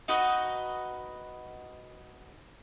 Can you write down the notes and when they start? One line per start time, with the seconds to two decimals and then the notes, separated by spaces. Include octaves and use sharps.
0.08 D#4 F#4 B4 D#5